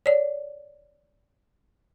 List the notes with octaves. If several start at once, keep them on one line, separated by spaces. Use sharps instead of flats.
C#5 D5